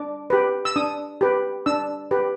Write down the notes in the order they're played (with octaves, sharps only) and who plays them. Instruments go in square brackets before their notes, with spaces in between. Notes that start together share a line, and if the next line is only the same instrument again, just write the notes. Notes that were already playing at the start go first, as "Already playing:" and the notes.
Already playing: [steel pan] D4 D6
G4 B4
E6
D4 D#6
G4 B4
D4 E6
G4 B4